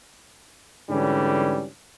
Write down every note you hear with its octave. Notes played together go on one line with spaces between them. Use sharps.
G#2 D3 E3 G3 C#4 D4